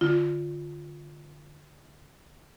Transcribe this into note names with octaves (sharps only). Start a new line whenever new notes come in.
D3 F4